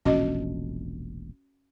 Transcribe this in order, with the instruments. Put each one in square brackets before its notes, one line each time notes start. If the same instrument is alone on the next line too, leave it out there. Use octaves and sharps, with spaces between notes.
[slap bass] E1 A#1 A2 [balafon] C#4 F#4 D#5